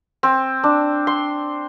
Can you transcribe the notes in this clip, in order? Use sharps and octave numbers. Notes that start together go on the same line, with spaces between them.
C4
D4
C6